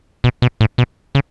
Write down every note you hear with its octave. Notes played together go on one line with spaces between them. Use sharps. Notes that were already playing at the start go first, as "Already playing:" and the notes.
B2
B2
A2
B2
C#3